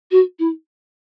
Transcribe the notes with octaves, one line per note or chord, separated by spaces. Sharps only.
F#4
E4